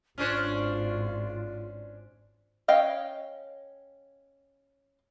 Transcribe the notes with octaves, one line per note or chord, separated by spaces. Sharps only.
G#1 C#4 D4 F4 C5
C#4 D#5 F5 G5